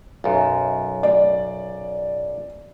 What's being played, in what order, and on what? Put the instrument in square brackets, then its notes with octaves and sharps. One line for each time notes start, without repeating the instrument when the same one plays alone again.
[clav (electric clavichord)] B1 F#2
[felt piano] D5